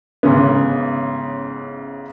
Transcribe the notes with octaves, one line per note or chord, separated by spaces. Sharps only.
A1 G#2 C#3 B3